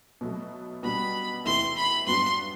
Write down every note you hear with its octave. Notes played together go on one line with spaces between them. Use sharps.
B2 F#3 A3
B2 G3 D4 F#4 B5
E2 C3 E3 A3 E4 C6
B5
G2 F#3 B3 D4 F#4 C6